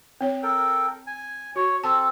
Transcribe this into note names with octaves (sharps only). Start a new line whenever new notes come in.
C4 C#5
A4 A#4 G5
G#5
F#4 C#5
C4 A4 A5